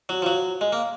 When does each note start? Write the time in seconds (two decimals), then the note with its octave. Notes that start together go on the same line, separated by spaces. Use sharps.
0.09 F#3
0.22 F3
0.26 F#3
0.61 G#3
0.72 A#3